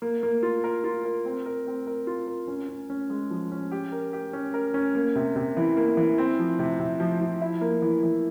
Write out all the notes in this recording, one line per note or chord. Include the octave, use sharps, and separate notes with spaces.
A#3
A#3
F4
A#4
F4
A#4
C4
A#4
C4
A#4
F4
A#4
C#4
C#4
C#4
G#3
F3
C#4
G4
A#4
G4
C#4
A#4
C#4
A#3
C3
C3
E3
A#3
E3
C4
F3
C3
C3
F3
F3
E4
A#3
E3
E3